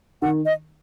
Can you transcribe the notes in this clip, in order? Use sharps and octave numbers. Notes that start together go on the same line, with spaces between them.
D#3 F#5
D#5